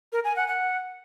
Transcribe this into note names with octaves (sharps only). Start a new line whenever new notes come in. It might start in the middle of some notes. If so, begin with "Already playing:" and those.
A#4
G#5
F#5
F#5